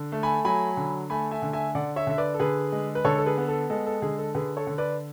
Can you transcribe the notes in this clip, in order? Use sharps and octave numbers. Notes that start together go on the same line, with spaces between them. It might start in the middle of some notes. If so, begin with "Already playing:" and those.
Already playing: D3
A3
G#5 B5
F#3 G#5 B5
D3
A3 G#5 B5
E5 G#5
D3
E5 G#5
D3 D5 F#5
C#5 E5
D3 E5
B4 D5
A4
D3 G#4 B4
G#3
B4
D3 A4 C#5
A4
G#4 B4
B3
A4
G#3 A4
A4
D3 G#4
A4
D3 G#4 B4
A4 C#5
D3
B4 D5